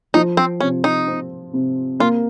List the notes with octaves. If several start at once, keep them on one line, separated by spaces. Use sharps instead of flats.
F3 D#4
C4
C3 C#4
D#4
C4
C3
A#3 F4